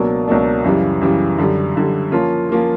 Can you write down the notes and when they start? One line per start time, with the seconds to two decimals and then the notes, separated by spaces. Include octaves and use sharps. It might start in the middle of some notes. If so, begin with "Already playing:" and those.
Already playing: C#2 B2 F#3 A#3 D4
0.28 C#2 B2 F#3 A#3 D4
0.64 F#2 C#3 E3 G3
1.01 F#2 C#3 E3 G3
1.38 F#2 D3 G3
1.76 F#2 D3 G3
2.12 F3 A#3 C#4 F4
2.50 F3 A#3 C#4 F4